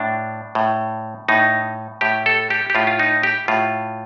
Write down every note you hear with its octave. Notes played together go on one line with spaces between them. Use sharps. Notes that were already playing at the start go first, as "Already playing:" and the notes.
Already playing: A2 D4
A2
A2 D#4
A2 G4
A4
G4
G4
A2 F4
F4
D#4
G4
A2 F4